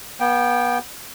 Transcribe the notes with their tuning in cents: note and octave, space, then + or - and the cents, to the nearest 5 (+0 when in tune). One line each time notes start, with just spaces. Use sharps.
B3 -35 G5 +0